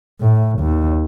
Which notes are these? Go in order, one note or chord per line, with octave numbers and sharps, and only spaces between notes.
A2
D#2